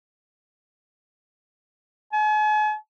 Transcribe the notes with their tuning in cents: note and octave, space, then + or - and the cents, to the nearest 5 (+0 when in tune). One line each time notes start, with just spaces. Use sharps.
G#5 +40